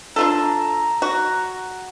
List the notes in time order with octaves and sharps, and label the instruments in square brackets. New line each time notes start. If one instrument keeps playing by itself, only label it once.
[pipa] D4 F4 A4 [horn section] A#5
[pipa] F#4